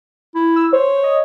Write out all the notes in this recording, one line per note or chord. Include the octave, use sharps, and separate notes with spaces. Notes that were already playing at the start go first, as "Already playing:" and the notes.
E4
E6
C5 C#5
D#5